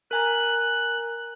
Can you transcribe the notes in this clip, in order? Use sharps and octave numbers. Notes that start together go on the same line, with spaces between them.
A#4 G#5 A#5 F#6